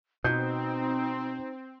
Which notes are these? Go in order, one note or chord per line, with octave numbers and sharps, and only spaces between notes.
B2 C4 D#4 G6